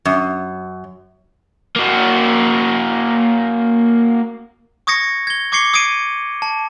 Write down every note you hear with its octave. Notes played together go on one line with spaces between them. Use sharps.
F#2
A#3 F#4
C#6 D#6 G#6 A#6 C#7
G#6 G7
C#6 D6 G#6 C7 C#7 G7
D#6 G#6 C7 D7 D#7
A5